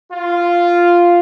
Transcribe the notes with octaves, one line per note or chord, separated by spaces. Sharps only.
F4